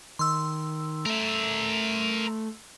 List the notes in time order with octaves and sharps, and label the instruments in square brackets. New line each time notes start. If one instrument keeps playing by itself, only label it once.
[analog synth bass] D#3 [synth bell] C6 E6
[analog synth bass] A3 [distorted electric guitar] A#4 E5